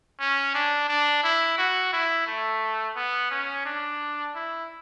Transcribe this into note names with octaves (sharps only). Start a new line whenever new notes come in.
C#4
D4
D4
E4
F#4
E4
A3
B3
C#4
D4
E4